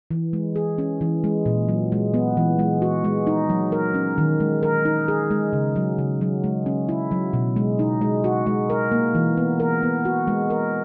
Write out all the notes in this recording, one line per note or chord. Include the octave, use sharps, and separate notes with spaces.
E3
G#3
G#4
C#4
E3
G#3
A#2
F#3
G#3
B3
E3
G#3
F#4
G#3
D#4
F#3
A#4
C#4
D#3
G#3
A#4
D#4
G#4
G#3
C#3
F#3
C#3
F#3
G#3
C#4
E4
F#3
B2
G#3
D#4
G#3
F#4
G#3
A#4
A#3
E3
B3
A#4
B3
F#4
G#3
A#4